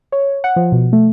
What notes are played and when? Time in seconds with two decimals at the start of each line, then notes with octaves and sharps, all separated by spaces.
0.12 C#5
0.44 F#5
0.56 F3
0.72 B2
0.93 A3